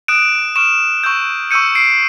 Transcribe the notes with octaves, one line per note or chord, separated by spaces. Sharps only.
D#6 F#6 D7 E7
C#6 F6 D7 E7
C#6 E6 G6
C#6 E6 G6 C#7 D#7
C7 D7